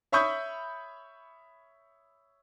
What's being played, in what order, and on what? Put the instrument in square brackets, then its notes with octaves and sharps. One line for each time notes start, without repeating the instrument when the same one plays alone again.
[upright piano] C#5 E5 B5 C#6 D#6 G6